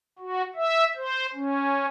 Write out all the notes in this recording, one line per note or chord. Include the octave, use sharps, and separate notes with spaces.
F#4
E5
C5
C#4